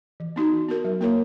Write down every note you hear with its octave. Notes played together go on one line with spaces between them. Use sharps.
E3
B3 D#4 F#4
E3
B3 F#4 A#4
F#3
A#3 E4 A#4 C#5